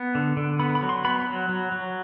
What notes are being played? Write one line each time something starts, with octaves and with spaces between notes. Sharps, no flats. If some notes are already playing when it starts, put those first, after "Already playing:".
Already playing: B3
D3
D3
B3 B5
B5
F#3
C6
B3 B5
F#3
F#3
F#3